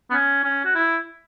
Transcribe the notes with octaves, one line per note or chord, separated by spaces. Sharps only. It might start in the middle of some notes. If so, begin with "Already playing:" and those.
B3
C#4
C#4
F#4
E4